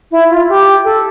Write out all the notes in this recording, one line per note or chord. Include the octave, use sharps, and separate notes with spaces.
E4
F4
G4
A4